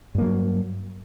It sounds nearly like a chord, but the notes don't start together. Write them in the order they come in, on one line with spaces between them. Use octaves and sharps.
G2 A#3 F#3